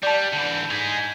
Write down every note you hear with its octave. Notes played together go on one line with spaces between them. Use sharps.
G3 D5 A5 G6 B6
D3 E3
D#4 G#4 G#6 B6